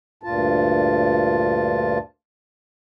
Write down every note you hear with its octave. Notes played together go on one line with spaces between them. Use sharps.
D2 G2 A#2 F4 A5